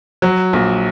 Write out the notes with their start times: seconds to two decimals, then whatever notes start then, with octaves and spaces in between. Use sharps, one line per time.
0.22 F#3
0.53 A#1